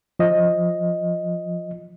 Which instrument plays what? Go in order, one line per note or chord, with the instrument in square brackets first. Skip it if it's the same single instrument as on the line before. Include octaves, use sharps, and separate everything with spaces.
[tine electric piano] F3 D#5